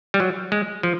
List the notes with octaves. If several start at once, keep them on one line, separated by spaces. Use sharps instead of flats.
G3
F#3
G#3
F3